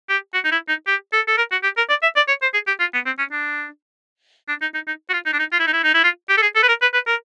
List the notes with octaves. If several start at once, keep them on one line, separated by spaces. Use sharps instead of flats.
G4
F#4
D#4
E4
D#4
G4
A4
A4
A#4
F#4
G4
A#4
D5
E5
D5
C#5
C5
G#4
G4
F4
B3
C4
C#4
D4
D4
D#4
D#4
D#4
F#4
F4
D#4
D4
D#4
F4
E4
D#4
E4
D#4
E4
F4
G4
A4
G#4
A4
B4
A#4
B4
B4
A#4